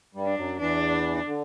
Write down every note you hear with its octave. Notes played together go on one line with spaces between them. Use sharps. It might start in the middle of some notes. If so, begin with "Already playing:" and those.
G2 G3
D4
F#2 F#3
E2 E3 D4
D3